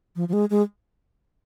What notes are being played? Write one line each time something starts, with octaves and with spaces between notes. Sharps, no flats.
F3
F3
G#3
G#3